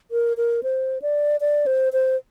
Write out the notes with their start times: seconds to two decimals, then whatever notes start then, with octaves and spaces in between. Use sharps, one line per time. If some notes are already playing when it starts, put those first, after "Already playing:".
0.11 A#4
0.37 A#4
0.63 C5
1.02 D5
1.41 D5
1.66 C5
1.93 C5